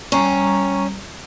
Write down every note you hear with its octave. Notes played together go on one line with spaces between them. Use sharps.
G3 C#4 A#5 C#6